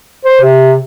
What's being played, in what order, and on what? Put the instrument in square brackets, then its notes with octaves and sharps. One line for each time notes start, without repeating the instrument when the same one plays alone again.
[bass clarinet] C5
C3